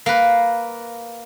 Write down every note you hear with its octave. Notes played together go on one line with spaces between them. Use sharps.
A#3 B4